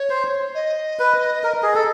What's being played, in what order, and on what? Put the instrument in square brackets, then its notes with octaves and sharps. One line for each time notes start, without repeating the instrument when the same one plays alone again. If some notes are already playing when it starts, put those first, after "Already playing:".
Already playing: [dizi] C#5
[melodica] C5
[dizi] D#5
[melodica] B4
A#4
G#4
A4